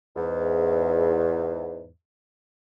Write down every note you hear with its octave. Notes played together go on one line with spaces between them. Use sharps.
E2 G#2